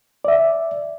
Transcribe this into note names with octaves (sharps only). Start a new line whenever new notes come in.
D5 E5